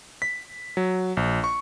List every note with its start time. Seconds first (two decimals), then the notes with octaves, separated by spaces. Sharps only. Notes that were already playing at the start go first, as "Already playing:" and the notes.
0.22 B6
0.77 F#3
1.17 A#1
1.44 C#6